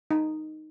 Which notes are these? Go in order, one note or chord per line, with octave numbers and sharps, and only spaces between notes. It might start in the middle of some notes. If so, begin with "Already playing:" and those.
D#4